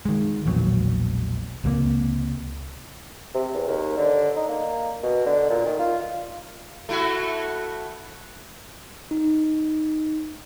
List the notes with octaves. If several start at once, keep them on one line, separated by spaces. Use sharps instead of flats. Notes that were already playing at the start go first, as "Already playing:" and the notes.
D#3 G#3
E1 A#1 B2 F#3
C#2 C3 F#3 A#3
C3
E2
D#2
D3
D#4
A#3
B2
D3
A#2
D#3
F4
A3 E4 F#4
D#4